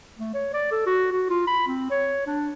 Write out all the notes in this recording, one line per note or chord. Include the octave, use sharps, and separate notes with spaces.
A3
C#5
D5
A4
F#4
F#4
F4
B5
C4
C#5
D4